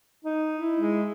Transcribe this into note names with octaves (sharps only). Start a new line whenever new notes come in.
D#4
E4
G#3